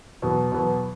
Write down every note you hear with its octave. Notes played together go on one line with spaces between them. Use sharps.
E2 B2 F#3 B3
E2 B2 F#3 B3